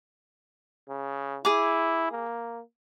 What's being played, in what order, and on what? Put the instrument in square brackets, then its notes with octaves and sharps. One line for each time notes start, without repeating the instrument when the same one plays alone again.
[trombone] C#3
[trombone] E4 [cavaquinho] G#4 G#5 D6
[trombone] A#3